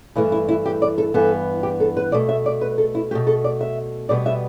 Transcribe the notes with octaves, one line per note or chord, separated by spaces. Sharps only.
G2 E3 A3 E4
E4
E4
G4
D5
A4
G2 E3 B3 A4
G4
A4
B4
B2 A3 D5
E5
D5
B4
A4
E4
B2 A3 G4
A4
D5
E5
B2 G3 B3 D5
E5